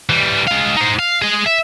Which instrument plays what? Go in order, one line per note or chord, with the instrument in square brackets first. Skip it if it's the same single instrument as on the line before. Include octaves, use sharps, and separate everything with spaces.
[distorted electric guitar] E3 G3
G#3 F5
D#4 C5
F5
G#4 D#5
E5